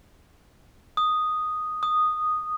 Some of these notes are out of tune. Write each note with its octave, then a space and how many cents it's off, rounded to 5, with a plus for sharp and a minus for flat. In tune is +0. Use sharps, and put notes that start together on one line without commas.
D#6 -5
D#6 -10